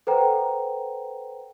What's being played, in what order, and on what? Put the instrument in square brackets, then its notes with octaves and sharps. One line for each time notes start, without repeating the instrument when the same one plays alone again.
[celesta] A4 B4 C5 F#5 G5 A#5